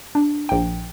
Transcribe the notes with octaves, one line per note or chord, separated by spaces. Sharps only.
D4
A#1 G5